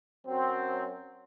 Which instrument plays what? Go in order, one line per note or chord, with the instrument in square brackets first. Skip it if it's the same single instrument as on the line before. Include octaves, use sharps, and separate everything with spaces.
[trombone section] F#2 F#3 C4